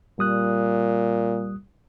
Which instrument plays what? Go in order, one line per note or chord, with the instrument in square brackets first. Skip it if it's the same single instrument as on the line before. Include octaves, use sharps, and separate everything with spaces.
[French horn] A#2 [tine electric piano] G3 D#6 F#6